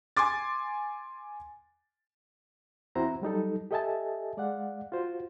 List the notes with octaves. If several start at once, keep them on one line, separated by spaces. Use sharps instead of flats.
G#5 C6 D6 A6
E2 C4 E4 F#4 C5 A#5
F#3 G3 D#4 A4
G4 A4 D#5 E5 G#5 A5
G#3 D5 F5 F#5
F4 F#4 C5